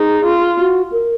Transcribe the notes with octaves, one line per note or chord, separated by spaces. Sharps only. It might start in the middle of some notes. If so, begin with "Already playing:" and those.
Already playing: D#4 G#4
F4
F#4
A#4